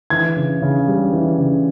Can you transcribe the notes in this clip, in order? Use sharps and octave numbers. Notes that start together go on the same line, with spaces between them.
E3 G#6
C#3
C#3
G3
E3
C#3